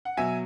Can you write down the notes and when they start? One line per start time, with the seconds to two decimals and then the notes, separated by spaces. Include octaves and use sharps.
0.05 F#5
0.17 B2 F#3 E5 G#5